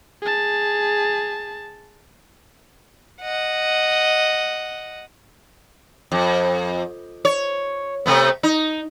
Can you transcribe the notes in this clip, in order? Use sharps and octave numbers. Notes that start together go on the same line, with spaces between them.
G#4 A5
D#5 F#5
F2
C#5
C3 A3 B3
D#4